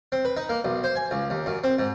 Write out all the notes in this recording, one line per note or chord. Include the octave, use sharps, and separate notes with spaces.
C4
B4
D#4
A#3
B1
C5
G#5
C#2
D#2
F#2
C4
G#2